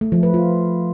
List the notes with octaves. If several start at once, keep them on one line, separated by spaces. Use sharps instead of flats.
A3
F3
B4
F4